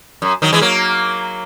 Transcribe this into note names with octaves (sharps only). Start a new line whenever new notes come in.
F#2
D#3 F#3
E3 G#3
F#3 A#3